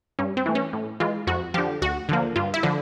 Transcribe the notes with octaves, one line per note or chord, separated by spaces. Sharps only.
G2 C#4
C4
E3 A3
C#4
A2
E3 G#3 F4
F2 F#4
D3 F3 G4
D2 F#4
D3 F3 A#3
G2 F4
E4
D3 F3